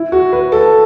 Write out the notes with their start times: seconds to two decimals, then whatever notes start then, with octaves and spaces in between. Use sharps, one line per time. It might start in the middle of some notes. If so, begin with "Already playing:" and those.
Already playing: E4
0.12 F#4
0.33 B4
0.52 A4